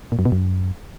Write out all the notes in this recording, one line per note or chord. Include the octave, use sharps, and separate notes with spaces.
A#2
F#2
B2
F#2